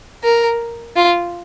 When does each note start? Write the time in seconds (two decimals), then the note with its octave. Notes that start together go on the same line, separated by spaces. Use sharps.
0.24 A#4
0.96 F4